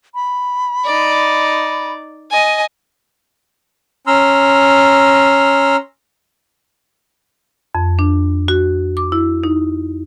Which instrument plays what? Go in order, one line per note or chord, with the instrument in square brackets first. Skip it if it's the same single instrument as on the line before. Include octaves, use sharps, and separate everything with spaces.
[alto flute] B5
[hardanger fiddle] D#4 D5
D#5 G#5
[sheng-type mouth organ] C#4 A#5 C6 E6 F6
[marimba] F2
D4
F#4
D6
E4
D#4